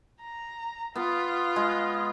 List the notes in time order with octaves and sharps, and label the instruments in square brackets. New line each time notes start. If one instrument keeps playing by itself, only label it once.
[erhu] A#5
[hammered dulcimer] B3 [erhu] F4
[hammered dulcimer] G#3